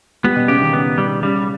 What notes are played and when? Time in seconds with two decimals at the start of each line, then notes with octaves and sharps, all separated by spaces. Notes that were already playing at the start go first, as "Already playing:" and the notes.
0.24 G3 B3
0.36 B2
0.48 C#3 G4
0.62 D#3
0.73 C#3 B3
0.98 G3
1.23 C#3 G3